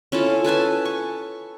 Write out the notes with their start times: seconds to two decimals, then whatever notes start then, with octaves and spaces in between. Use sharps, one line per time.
0.12 C#4 E4 F4 A4
0.44 A4 B4 G#5 A5
0.85 C#6